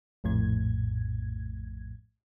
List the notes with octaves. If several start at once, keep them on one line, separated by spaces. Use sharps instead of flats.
A#1 F2 A2 G#6